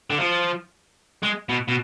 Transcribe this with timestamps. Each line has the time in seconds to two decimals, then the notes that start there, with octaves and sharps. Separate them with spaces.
0.10 D3
0.19 F3
1.23 G#3
1.49 B2
1.68 B2